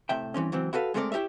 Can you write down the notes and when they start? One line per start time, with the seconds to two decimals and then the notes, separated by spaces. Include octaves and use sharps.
0.09 A2 C3 E5 G5
0.34 G2 E3 C4 C#4
0.52 C#2 E3 F#3 C4
0.73 E4 F#4 A4 B4 F5
0.94 G#3 A3 C4 A4 A#4 D5
1.12 E4 G4 A#4 C#5 E5